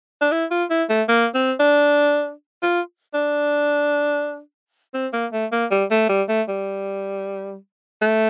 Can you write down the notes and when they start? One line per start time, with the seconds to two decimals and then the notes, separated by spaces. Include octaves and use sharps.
0.21 D4
0.32 E4
0.51 F4
0.70 E4
0.90 A3
1.09 A#3
1.35 C4
1.60 D4
2.63 F4
3.14 D4
4.94 C4
5.13 A#3
5.32 A3
5.52 A#3
5.71 G3
5.91 A3
6.09 G3
6.29 A3
6.48 G3
8.02 A3